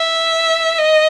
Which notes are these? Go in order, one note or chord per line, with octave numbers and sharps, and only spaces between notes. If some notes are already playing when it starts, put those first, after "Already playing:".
Already playing: E5
D#5